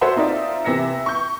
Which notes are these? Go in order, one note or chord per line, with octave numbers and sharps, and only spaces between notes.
F#4 A4 C5 C#5 E5 F#5
C4 D#4 F4 D5 E5
C3 E3 E5 A#6 C#7
C#6 G6